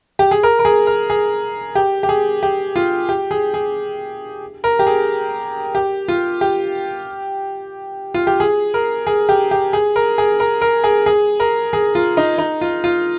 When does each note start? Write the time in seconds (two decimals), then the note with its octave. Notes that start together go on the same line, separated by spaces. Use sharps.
0.19 G4
0.31 G#4
0.43 A#4
0.59 A#4
0.65 G#4
0.87 A#4
1.10 G#4
1.75 G4
2.03 G4
2.09 G#4
2.43 G4
2.76 F4
3.09 G4
3.31 G#4
3.54 G#4
4.64 A#4
4.79 G4
4.87 G#4
5.75 G4
6.08 F4
6.41 G4
8.14 F4
8.27 G4
8.40 G#4
8.74 A#4
9.07 G#4
9.29 G4
9.51 G4
9.73 G#4
9.96 A#4
10.18 G#4
10.40 A#4
10.61 A#4
10.84 G#4
11.06 G#4
11.40 A#4
11.73 G#4
11.95 F4
12.17 D#4
12.38 D#4
12.61 F4
12.84 F4